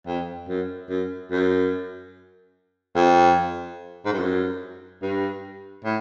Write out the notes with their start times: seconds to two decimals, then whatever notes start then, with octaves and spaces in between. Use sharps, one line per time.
0.07 F2
0.48 F#2
0.89 F#2
1.31 F#2
2.96 F2
4.05 G#2
4.13 G2
4.19 F#2
5.02 G2
5.84 A2